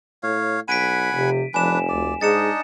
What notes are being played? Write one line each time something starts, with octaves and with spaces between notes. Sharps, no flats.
A2 C#5 F5
B1 F#5 G#5 B5 B6 D7 D#7
F1 C3
F1 F3 D4 B4 G#5 E7
D2 D5
G#2 D4 D#4 G#4 D#5 A6 C#7 E7